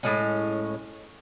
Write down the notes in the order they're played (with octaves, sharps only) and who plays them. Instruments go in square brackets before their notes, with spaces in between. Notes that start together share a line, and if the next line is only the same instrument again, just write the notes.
[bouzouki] A2 G#3 C#4